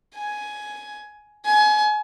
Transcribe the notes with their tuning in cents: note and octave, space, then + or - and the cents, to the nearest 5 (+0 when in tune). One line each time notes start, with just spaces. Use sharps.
G#5 +10
G#5 +30